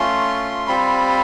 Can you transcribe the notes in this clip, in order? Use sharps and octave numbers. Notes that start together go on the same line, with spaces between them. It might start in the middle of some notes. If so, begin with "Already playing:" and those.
Already playing: A3 C#4 F4 C6
G3 C4 F4 B5